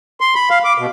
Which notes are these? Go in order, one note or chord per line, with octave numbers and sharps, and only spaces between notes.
C6
B5
F5
D6
B2